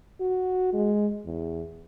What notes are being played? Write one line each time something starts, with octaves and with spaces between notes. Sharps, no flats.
F#4
G#3
E2